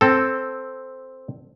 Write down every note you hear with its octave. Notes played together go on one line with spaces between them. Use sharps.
C4 A4